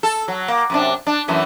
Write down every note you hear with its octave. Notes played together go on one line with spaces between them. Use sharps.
A4
F#3
A#3
F#2 C3 D4
D4
F#2 E3 A3